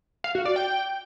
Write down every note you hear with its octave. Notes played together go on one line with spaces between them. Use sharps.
F5
F#4
D5
G5